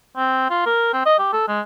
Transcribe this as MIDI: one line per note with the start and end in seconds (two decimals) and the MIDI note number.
0.17 0.45 60
0.50 0.61 65
0.66 0.90 70
0.93 1.04 60
1.06 1.14 75
1.18 1.30 67
1.33 1.47 69
1.48 1.61 56